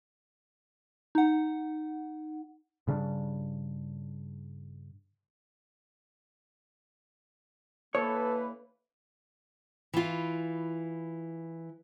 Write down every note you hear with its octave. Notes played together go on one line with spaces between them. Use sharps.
D#4 F#5
G2 C#3 G3 D4
D3 E3 A#3 A4 B4 C#5
E3 F4